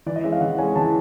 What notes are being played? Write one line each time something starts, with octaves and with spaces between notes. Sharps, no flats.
E3 D5
D#5
G#3 C#4 E5
F5
E3 F#5
G#3 C#4 G#5
E3 A5